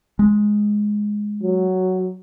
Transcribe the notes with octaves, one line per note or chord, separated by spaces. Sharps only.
G#3
F#3